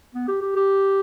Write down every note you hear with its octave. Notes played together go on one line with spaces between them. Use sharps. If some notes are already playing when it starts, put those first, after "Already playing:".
B3
G4
G4
G4